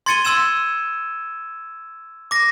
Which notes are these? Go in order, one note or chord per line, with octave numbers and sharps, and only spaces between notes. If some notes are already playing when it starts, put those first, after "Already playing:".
C6 G#6 A6 C#7 D#7 G7
C6 E6 G#6 E7
D6 A#6